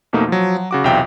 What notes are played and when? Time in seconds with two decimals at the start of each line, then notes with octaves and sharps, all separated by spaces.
0.13 F2 B2 A3 A#3 D#4
0.28 F3 F#3
0.57 F#3
0.71 C#3 F#4 D6
0.84 B1 E2 C3 F4 E5 G5